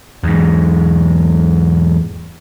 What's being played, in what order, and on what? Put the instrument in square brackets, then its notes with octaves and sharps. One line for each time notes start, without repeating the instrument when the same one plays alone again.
[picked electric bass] E2 G#2